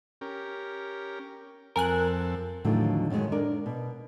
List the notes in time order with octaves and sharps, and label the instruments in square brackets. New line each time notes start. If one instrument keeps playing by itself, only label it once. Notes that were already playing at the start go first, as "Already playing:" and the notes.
[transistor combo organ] C#4 G4 A#4
[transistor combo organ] F2 C4 A4 [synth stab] A#4 G#5 F#6
[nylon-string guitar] E2 A2 D3 D#3 F3 F#3
F#2 D#3 E3 G#3 C#5
D4 A#4 D5
B2